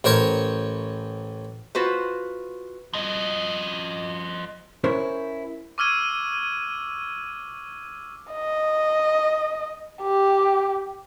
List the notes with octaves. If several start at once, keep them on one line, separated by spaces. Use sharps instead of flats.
A1 A#4 C5 C#5 C#6
F4 F#4 B4 C5
F3 D#5
C#4 E4 A#4 C5 C#5
C#6 D6 E6 F6 G#6 D#7
D#5
G4